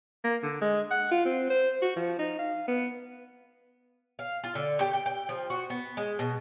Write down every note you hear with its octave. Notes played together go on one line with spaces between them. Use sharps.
A#3
D3
G#3
F#5
F4
C4
C5
F#4
F3
D#4
F5
B3
F5
F4
D3
G4
G5
G5
F3
F#4
B3
G#3
B2